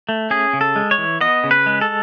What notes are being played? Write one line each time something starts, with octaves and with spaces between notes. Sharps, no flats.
A3
C#4 G#4
C#3
A4
G#3
C#5
E3
B3 D#5
C#3
B4
G#3
A4